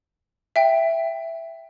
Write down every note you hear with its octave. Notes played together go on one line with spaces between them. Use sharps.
E5 G5